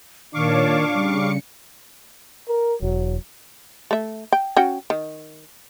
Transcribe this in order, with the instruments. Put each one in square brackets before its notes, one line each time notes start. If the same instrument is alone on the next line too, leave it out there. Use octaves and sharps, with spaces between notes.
[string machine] A#2 C#5 A5 [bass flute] D#3 [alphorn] D4 [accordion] F5 C#6 D6
[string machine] C#3 C#7 [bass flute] G3
[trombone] A#4
[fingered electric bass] E1 [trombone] F#3
[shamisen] A3 E5
G5
C#4 F#4 G5
D#3